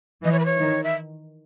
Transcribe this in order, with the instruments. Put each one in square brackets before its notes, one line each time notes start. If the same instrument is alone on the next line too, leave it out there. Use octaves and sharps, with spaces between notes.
[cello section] E3 [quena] D#5
[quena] C#5
B4
C#5
[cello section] D#3
[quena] E5